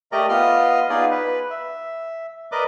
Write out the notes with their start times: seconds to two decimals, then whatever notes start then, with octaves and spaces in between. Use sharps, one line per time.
0.12 A3 G4 A#4 D5 D#5 A#5
0.29 B3 F4 D#5 F6
0.90 B3 D#4 F4 G#4 D5
1.11 B4
1.51 E5
2.52 A#4 B4 D5 D#5 D6